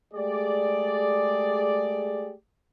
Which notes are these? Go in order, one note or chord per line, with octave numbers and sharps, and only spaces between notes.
G#3 A3 G4 G#4 D5